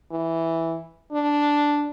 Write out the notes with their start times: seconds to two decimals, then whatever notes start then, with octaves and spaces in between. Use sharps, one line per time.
0.11 E3
1.12 D4